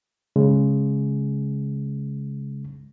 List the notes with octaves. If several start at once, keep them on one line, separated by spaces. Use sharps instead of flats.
C#3 G#3